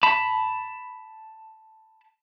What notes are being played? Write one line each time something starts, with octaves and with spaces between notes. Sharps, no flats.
A5 B5